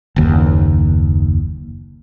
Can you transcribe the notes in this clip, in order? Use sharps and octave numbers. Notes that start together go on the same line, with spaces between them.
F#1 D#2